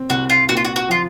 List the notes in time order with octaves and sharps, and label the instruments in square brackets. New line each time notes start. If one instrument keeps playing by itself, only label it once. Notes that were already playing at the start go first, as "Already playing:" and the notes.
Already playing: [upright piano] C4
[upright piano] C2 [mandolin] F#4
[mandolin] F4
[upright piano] A#2 [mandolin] F#4
[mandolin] F4
F#4
F#4
[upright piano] F3 [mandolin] F4